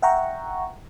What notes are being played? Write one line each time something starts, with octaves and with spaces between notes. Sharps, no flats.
E5 F#5 G5 A#5 C#6